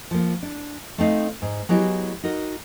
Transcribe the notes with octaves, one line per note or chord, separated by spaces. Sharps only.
F3 A#3
D4
A3 C4 D#4 F5
G#2
F#3 G#3 B3 E4 G4
D#4 F#4 A#4